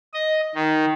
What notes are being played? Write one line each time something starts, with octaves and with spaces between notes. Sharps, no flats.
D#5
D#3